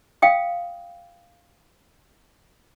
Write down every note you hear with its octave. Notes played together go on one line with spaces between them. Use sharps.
F5 G5 D#6